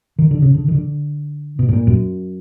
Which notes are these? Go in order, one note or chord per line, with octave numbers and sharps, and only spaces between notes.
D#3
D3
C#3
D3
D#3
D3
B2
A2
A#2
F#2